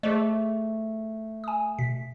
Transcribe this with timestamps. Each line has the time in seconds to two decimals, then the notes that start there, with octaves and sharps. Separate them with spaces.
0.03 A3 G#4 C5 D#5
1.44 G#5 D#6
1.79 B2 B6